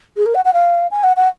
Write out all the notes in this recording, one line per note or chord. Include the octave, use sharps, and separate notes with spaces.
G#4
A#4
F#5
F#5
F5
G#5
F#5
F#5